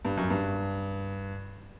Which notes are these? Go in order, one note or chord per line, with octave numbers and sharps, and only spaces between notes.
G2
F#2
G2